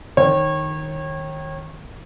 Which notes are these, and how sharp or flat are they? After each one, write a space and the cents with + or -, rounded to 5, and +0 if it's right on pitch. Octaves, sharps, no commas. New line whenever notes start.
D#3 +0 C#5 -30